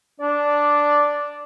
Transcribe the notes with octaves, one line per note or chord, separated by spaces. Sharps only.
D4 D5